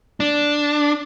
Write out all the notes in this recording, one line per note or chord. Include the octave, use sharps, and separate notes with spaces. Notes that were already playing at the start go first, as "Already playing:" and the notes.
D4